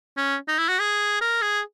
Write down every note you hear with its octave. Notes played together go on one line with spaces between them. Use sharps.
C#4
D#4
E4
F#4
G#4
A#4
G#4